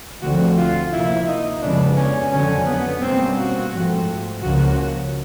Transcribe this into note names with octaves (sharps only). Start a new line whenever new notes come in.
D2 D3 F3 A3 C4 F#4
F4
C3 F3 A#3 E4
D#4
F2 C#3 F3 G#3 B3 D4
C#4
F2 D3 F#3 C#4
B3
B2 G3 A#3 C4 C#4
F#4
G#2 F3 A3 C4
C#2 C#3 F3 A#3 C#4 F#4